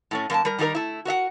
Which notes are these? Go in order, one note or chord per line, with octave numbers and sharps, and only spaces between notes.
A2 A3 C#4
F#2 A#3 G#5 A5
G3 A#4
D#3 G3 D#4 G4 A#4
A3 E4
F#4 A#4 E5 F#5